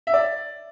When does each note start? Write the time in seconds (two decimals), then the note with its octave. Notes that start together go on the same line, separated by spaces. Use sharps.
0.07 E5
0.13 D5